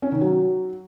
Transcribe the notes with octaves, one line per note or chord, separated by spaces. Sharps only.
C#4
D#3
F#3